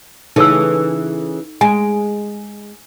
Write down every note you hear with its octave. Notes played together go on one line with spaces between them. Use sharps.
C#3 E3 A3 D#4 A4 E6
G#3 G#5